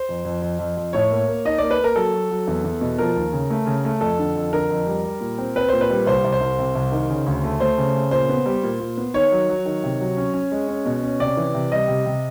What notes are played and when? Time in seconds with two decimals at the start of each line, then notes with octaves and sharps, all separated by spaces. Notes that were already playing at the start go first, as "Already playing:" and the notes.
Already playing: C5
0.09 F2
0.25 F2
0.42 F2
0.59 F2
0.77 F2
0.93 A2 C#5
1.11 A#3
1.28 A#3
1.45 D#4 D#5
1.58 A#3 D5
1.71 B4
1.79 A#3 A#4
1.96 F#3 A4
2.13 F#3
2.31 F#3
2.48 E2
2.64 E2
2.81 B2
2.98 F3 A#4
3.16 D#2
3.32 C#3
3.50 A3
3.67 C#3
3.85 A3
4.01 F2 A4
4.19 D3
4.35 F2
4.53 D3 A#4
4.70 F2
4.87 G3
5.04 G3
5.21 A#2
5.38 C4
5.56 C4 B4
5.69 A#2 C5
5.81 B4
5.90 G3
6.06 C2 C5
6.24 C2
6.33 C5
6.41 C2
6.59 C3
6.75 C2
6.92 D#3
7.10 C#3
7.27 D2
7.44 A3
7.60 A3 C5
7.78 C#3
7.95 C#3
8.11 A#2 C5
8.29 B3
8.46 G3
8.63 A#2
8.80 A#2
8.97 B3
9.14 D#3 C#5
9.32 F#3
9.49 F#3
9.65 D#3
9.84 C3
10.00 F#3
10.17 C#4
10.34 C#4
10.52 G#3
10.68 C#4
10.85 B2
11.03 C#4
11.20 C3 D5
11.37 E3
11.54 C3
11.72 G3 D#5
11.88 C3
12.06 C3